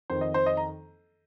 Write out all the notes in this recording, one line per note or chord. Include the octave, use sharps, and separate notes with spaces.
F2 D#3 C5
D#5
C5
D#5
A#5